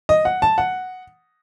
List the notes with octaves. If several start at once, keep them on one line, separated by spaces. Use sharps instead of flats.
D#5
F#5
A5
F#5